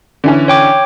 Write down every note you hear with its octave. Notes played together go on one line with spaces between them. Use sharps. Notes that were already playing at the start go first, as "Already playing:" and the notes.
D3 E3 C#4
C#5 G5 D6